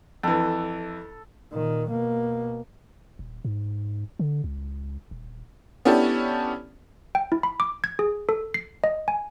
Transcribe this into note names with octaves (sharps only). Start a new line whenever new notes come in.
F2 E3 A4
A#2 D#3
B2 A#3
D#1
G#2
D3
C#2
D#1
B3 C#4 D4 E4 G4 A4
G5
E4
B5
D6
G#6
G#4
A4
C7
D#5
G#5